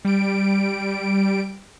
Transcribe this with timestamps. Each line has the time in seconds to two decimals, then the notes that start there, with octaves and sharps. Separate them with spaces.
0.05 G3 D7